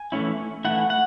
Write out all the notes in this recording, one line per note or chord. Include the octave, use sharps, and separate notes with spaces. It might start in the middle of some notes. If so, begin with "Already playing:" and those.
Already playing: G#5
E3 A3 C#4 E4
E3 A3 E4 F#5
F#5